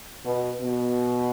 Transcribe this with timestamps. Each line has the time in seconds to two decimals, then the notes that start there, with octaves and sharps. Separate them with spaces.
0.24 B2
0.61 B2